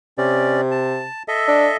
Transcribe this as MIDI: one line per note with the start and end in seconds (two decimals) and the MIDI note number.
0.18 1.06 48
0.18 0.61 61
0.18 0.61 74
0.71 1.23 81
1.28 1.77 69
1.28 1.77 75
1.28 1.77 76
1.48 1.68 62